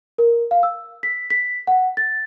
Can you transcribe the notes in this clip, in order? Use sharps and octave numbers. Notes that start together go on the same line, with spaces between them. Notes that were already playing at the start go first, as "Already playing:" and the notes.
A#4
F5
E6
B6
B6
F#5
A6